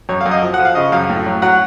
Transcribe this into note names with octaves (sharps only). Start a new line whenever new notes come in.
F#2 C#5
F5
F#2
D#5
F3
F#5
F3
F5
C#3 D#5
F#2 F5
A2
F#3
F#3 F#5